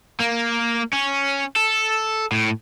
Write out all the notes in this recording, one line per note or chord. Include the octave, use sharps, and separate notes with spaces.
A#3
C#4
A4
A2